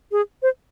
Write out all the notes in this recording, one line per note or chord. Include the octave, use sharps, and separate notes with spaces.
G#4
C5